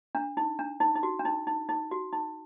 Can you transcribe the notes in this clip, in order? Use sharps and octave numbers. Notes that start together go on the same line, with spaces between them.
D4
D#4
D4
D#4
D#4
F#4
D4
D#4
D#4
D#4
F#4
D#4